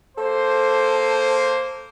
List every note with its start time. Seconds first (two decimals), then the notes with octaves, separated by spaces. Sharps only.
0.17 A#3 A4 C5